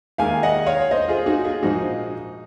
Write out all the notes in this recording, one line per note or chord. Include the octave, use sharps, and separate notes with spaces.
D#2 D#3 G#3 F5 G#5
D#5 F#5
C#5 F5
C5 D#5
F4 G#4
D#4 F#4
F4 G#4
A#1 G#2 F3 G#3 D#4 F#4